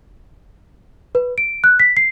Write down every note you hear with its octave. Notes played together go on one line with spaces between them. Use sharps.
B4
D7
F#6
B6
C7